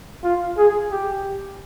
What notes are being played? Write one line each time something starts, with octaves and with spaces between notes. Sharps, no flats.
F4
G#4
G4